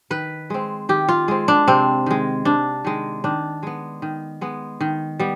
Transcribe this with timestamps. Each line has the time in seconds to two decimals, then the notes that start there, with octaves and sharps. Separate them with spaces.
0.10 D#3 B4
0.50 G#3 C4
0.89 D#3 G4
1.09 F4
1.28 G#3 C4
1.48 D4
1.68 C3 C4
2.06 D#3 G#3
2.45 C3 D4
2.85 D#3 G#3
3.24 D#3 D4
3.63 G#3 B3
4.02 D#3
4.41 G#3 B3
4.81 D#3
5.20 G3 B3